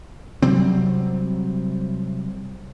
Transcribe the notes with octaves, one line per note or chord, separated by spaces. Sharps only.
C3 F#3 G3 C4